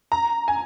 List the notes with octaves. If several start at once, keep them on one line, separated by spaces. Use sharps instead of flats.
A#5
G#5